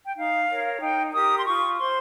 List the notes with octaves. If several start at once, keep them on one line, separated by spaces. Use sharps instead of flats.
G5
D#4 F5
A#4 C#5
D#4 G5
G4 A#4 D#6
C6
F4 C#6
C5 C6